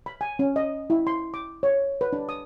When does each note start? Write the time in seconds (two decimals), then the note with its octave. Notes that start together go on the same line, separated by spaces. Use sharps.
0.06 B5
0.21 G#5
0.39 C#4
0.56 D#5
0.90 E4
1.07 C6
1.34 D6
1.63 C#5
2.01 B4
2.13 D4
2.29 D#6